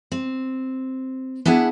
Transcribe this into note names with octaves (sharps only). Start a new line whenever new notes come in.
C4
B3 D4 E4 G#4 F#5